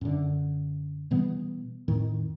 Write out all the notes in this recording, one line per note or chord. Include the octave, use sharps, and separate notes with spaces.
F#2 D3
B2 E3 G3 B3
F2 A2 D#3